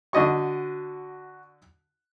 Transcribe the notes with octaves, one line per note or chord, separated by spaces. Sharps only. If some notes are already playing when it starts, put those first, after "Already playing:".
D3 F#4 D#5 C#6